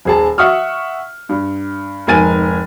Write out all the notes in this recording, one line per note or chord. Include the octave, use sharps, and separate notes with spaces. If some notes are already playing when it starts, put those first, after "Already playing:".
D#1 G#4 A5
E5 F#5 C#6 D#6 F6
G2
F1 G#2 A#4 G#5 A6 D#7